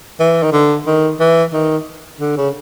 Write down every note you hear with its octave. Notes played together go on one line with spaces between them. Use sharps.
E3
D#3
D3
D#3
E3
D#3
D3
C#3